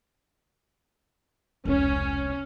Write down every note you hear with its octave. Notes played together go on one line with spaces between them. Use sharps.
E1 C2 C#4